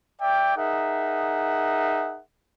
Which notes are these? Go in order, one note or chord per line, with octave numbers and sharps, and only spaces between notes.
D5 E5 G5
D#4 G#4 A#4 E5 F#5